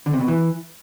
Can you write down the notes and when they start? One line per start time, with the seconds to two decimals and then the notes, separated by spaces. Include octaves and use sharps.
0.06 D3
0.13 C3
0.21 B2
0.28 E3